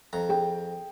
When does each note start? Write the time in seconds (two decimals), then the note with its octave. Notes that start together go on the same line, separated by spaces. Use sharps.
0.13 F2 A#5
0.29 G#4 G5